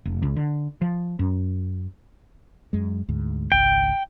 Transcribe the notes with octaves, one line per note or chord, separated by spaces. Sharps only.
F1
C#2
D3
F3
F#2
F#2 G#3
D2 G#2
G#1 C#2 G5